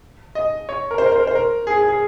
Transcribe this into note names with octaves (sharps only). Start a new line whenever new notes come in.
D#5
C#5
A#4
C5
A#4
C5
A#4
C5
A#4
G#4
G#4
G#4